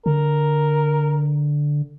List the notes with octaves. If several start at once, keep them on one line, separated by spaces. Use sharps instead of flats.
D3 A#4